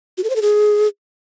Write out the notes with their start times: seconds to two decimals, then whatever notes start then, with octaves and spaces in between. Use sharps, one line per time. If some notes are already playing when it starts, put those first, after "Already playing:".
0.18 F#4
0.24 A4
0.30 C5
0.36 A4
0.42 G#4